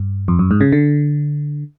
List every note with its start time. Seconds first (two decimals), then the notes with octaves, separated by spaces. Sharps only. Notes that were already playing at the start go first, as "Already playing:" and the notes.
Already playing: G2
0.28 F2
0.39 F#2
0.51 G#2
0.61 C#3
0.72 D3